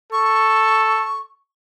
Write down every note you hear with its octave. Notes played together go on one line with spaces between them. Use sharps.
A4 C#6